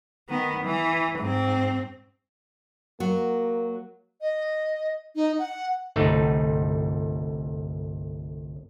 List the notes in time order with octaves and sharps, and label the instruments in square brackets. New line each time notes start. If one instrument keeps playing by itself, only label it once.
[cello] D#3 B3
E3
G#2 C4
[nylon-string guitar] F#3 [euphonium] A#3
[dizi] D#5
D#4
F#5
[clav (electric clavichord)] G1 C2 A3 D#4